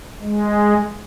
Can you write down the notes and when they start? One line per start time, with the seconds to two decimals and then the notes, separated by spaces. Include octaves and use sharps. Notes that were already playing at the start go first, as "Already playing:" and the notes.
0.22 G#3